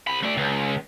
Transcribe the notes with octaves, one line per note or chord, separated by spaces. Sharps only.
C2 B5
A3 D5
C#2